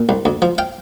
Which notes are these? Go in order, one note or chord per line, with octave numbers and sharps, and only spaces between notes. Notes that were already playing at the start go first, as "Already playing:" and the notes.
Already playing: A#2
C2
D2
F3
F5 G5